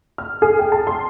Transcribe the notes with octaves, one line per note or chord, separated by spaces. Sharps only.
F6
G#4
G5
A5
C6